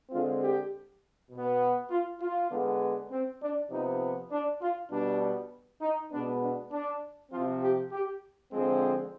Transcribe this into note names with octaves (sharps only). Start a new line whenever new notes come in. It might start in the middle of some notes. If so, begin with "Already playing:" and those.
D3 G#3 C4 F4
G4
B2 B3
F4
F4
D3 G#3 B3
C4
D4
C3 F3 B3 D#4
D4
F4
B2 G3 B3 D4
D#4
B2 G#3 B3 D4
D4
D4
C3 F3 C4 F4
G4
G4
D3 F3 G#3 C4